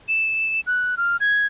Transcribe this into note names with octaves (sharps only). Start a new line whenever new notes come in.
E7
F#6
F6
G#6